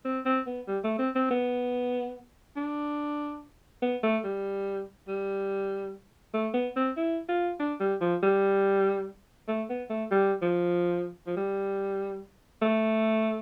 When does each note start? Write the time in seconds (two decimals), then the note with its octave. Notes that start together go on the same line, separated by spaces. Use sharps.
0.05 C4
0.26 C4
0.47 B3
0.68 G3
0.84 A3
0.99 C4
1.15 C4
1.31 B3
2.56 D4
3.82 B3
4.03 A3
4.24 G3
5.08 G3
6.34 A3
6.54 B3
6.76 C4
6.97 E4
7.29 F4
7.60 D4
7.80 G3
8.01 F3
8.23 G3
9.48 A3
9.70 B3
9.90 A3
10.11 G3
10.42 F3
11.27 F3
11.36 G3
12.62 A3